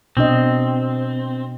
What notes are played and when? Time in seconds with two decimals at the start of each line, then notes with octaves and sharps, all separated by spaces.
0.17 B2 C4 D4 D#5